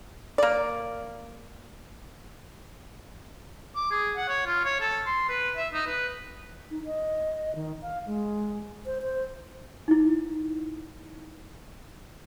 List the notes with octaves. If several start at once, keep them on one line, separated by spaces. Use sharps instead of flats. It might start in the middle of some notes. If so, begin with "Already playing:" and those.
A#3 D5
D6
G#4
F#5
C#5
F4
C#5
A4
C6
B4
E5
D#4
B4
D#4
D#5
D#3
F5
G#3
C5
C5
D#4 E4